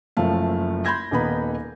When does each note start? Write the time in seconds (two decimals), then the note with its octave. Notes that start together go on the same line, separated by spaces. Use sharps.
0.17 F#1 F#2 F3 A3 F5
0.85 B5 C6 G6 G#6 A#6
1.11 D#1 D#3 A#3 B3 D#4 B5